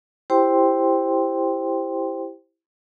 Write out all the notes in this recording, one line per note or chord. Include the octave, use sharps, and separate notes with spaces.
E4 G4 C5 G5 C6